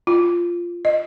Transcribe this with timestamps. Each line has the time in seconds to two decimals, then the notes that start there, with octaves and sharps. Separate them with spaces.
0.07 F4
0.85 D#5